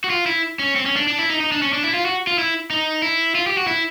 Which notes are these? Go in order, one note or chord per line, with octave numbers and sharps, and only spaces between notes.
F#4
F4
E4
C#4
C4
C#4
D4
D4
E4
D#4
D#4
D4
C#4
D4
E4
F4
F#4
F4
E4
D#4
E4
F4
G4
F#4
E4